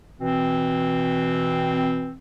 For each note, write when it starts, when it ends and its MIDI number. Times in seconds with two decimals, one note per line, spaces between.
0.21 2.13 47
0.21 2.13 52
0.21 2.13 60